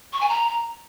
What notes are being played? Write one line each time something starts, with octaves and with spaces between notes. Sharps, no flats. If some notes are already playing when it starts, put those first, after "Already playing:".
C#6
G#5
A#5